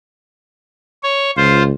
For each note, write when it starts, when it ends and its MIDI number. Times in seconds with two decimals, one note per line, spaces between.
1.03 1.31 73
1.37 1.71 37
1.37 1.63 65
1.37 1.63 72